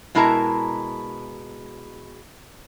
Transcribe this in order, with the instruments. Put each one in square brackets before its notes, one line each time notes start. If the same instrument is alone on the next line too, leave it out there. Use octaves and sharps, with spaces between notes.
[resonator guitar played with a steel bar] B2 G#3 E4 A#4 A5 A#5